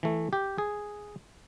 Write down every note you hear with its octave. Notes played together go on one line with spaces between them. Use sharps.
E3 A3
G4
G#4